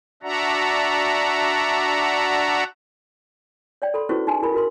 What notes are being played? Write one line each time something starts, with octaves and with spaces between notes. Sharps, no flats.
D4 F#4 D5 E5 F#5 A#5
C#5 D5 G5
A4 B5 C6
C#4 E4 F#4 B4 C5 C#6
D#4 G#4 G#5 C6
E4 G#4 A#4 B5
F#4 A#4 C6